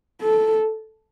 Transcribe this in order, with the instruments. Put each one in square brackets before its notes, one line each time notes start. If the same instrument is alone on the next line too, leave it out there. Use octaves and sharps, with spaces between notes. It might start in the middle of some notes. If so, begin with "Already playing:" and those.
[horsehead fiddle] A4